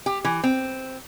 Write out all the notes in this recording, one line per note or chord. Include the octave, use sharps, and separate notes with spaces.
G4
E3
C4